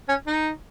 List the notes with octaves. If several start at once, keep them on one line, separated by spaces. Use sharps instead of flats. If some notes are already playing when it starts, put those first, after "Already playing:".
C#4
D#4